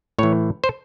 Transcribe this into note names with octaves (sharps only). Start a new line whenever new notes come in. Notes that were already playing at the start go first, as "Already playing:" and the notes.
A2 E3 C#5
C5